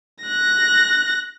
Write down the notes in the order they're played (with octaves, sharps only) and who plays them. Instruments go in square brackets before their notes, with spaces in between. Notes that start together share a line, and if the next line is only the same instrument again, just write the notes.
[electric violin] F#6 A#6